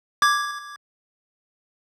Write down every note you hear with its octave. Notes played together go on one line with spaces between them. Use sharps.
D6 G#6